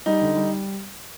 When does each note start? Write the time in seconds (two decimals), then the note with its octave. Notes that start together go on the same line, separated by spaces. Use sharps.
0.06 G3 D#4
0.22 D3
0.37 G3